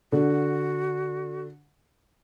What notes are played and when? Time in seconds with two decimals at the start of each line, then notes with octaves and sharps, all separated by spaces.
0.12 D3 F#4